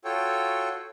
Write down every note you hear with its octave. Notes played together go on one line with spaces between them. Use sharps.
F4 F#4 A4 C#5 G5